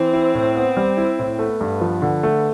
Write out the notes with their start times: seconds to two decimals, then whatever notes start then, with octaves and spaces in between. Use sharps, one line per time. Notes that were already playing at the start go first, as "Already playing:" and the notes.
Already playing: E3 C4
0.13 E4
0.35 A2
0.55 B3
0.77 G3
0.97 E4
1.19 A2
1.39 A3 B3
1.61 G2
1.81 F3
2.02 D3
2.23 A3